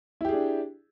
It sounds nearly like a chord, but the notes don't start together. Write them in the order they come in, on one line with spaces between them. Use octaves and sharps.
E4 G4 G#4 D4